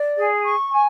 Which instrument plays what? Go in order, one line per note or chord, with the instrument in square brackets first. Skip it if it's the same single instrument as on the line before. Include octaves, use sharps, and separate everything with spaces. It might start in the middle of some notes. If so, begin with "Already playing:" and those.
Already playing: [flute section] D5
G#4
C#6
G#5